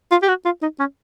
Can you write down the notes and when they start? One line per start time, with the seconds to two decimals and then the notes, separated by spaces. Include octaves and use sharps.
0.11 F4
0.22 G4
0.28 F#4
0.45 F4
0.62 D#4
0.79 C#4